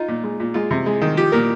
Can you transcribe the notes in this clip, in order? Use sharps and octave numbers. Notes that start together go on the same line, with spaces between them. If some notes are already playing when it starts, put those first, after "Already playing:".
Already playing: D#4 F4
A#2
G#3
A#2
G#3 F4
C3
G#3
D#3
F3 G4
A#2 A#4